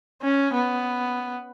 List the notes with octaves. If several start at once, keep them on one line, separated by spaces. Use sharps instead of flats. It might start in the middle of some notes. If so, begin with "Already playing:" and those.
C#4
B3